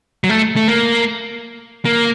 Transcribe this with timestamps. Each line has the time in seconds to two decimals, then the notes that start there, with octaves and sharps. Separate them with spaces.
0.24 F#3
0.29 A3
0.56 A3
0.68 A#3
1.85 A#3